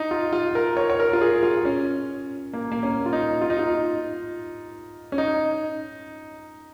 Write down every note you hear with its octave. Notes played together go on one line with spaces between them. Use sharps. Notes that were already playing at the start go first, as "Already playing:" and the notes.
Already playing: D#4
F4
F4
A#4
C#5
C#5
A#4
F4
G#4
F4
C#4
A#3
A#3
C#4
F4
D#4
F4
D#4
F4
C#4
D#4